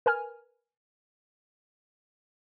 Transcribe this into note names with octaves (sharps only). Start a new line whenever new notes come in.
A#4 B4 G#5 F6